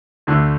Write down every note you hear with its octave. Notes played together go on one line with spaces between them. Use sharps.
D2 D3 A3